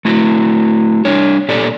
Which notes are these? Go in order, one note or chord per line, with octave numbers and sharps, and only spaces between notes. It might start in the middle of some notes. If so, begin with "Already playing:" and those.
A3 E4 F#4
G3 D4 C#5
A#2 G4 A4 D5